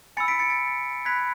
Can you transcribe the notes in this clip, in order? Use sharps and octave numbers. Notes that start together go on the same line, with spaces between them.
G#5 B5 E6 A6 C#7
B6 D7
A6 C#7
A6
B5 F#6 G#6 B6